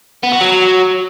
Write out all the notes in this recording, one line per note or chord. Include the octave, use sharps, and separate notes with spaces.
B3
F#4
F#3